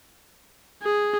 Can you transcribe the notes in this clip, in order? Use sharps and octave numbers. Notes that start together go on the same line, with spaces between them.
G#4